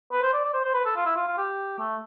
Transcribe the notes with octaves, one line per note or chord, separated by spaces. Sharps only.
B4
C5
D5
D5
C5
C5
B4
A4
F4
E4
F4
F4
G4
A3